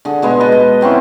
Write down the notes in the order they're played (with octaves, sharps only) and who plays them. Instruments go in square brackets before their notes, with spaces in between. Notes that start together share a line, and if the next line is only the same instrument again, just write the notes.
[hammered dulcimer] D3 G#4
B2 G#3 B4 G#5
B4 D#5 A5
D#5
F#3 C4 C#4 E4